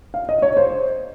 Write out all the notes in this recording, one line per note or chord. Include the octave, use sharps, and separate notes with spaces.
F5
D#5
C#5
C5